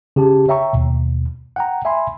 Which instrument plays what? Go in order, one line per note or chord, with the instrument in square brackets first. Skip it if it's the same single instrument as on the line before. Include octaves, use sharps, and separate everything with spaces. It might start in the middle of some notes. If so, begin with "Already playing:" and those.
[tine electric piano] C#3 G4 A5
C#5 E5 G5 A#5 C#6
D#2 B2
F#5 G5 A#5
E5 G#5 B5 C6